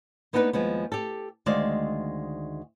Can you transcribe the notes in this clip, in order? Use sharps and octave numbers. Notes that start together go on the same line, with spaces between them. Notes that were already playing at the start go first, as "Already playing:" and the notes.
A#3 B3 D4 D#4 A4 B4
D#2 F3 G#3 B3
G4 A4
D2 D#3 G#3 C5 D5 F5